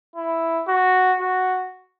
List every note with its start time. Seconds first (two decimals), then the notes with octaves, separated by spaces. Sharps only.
0.16 E4
0.68 F#4
1.20 F#4